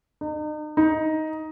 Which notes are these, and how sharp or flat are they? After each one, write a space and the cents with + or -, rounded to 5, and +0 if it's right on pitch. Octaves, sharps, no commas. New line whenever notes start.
D#4 -40
D#4 +10